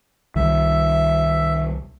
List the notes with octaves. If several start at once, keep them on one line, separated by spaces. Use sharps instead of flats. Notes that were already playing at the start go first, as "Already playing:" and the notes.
C2 D#3 G3 E5